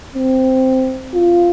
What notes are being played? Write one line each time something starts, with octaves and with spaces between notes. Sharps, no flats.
C4
F4